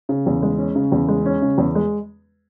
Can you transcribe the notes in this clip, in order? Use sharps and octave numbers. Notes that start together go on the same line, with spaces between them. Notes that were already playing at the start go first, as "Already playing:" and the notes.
C#3
E2
G#3
C#4
C#3
E2
G#3
C#4
C#3
E2
G#3